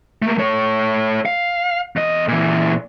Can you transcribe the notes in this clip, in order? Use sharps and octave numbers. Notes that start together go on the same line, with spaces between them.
A3 A#3
A3 C#5
F5
E2 D#5
A#2 E3